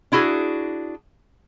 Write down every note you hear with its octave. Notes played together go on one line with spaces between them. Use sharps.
D4 E4 F#4 G#4